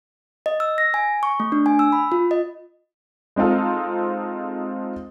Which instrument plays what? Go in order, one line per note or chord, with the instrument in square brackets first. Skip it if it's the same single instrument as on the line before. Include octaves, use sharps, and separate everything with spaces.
[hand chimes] D#5
E6
A#6
G#5
C#6
A3
D4
G#5
E6
B5
F4
D#5
[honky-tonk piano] G#3 C4 D#4 F4 A4